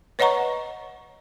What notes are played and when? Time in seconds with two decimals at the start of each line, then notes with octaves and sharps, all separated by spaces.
0.19 B4 C#5 D#5 F#5 A#5 C#6